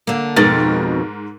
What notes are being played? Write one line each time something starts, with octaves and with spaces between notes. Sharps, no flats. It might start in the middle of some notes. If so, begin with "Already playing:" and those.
D3 A#3
F2 G#2 B2 A#4 A6